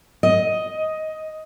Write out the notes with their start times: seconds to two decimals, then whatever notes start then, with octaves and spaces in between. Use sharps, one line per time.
0.23 D#5